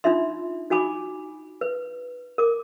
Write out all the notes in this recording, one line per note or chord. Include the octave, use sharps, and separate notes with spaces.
D4 D#4 F4 E5 C6
D#4 F#4 G#5 B5 D6
B4
A#4 D6